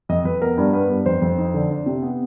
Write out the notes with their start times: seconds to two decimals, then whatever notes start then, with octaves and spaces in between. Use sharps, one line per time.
0.09 F2 D#5
0.25 F2 B4
0.41 B3 A#4
0.57 G2
0.73 B3 B4
0.89 G2
1.06 F2 C5
1.22 F2
1.38 D#4
1.54 D3
1.70 D4
1.86 C3
2.03 B3